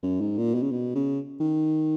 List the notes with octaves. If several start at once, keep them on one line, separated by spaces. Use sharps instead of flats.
F#2
G#2
A#2
B2
C#3
B2
C#3
D#3